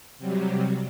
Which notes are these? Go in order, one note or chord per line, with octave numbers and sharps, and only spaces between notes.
C3 F#3 G3